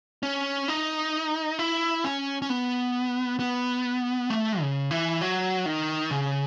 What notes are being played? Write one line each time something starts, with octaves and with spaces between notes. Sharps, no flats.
C#4
D#4
E4
C#4
C#4
B3
B3
A3
C#3
E3
F#3
D#3
C#3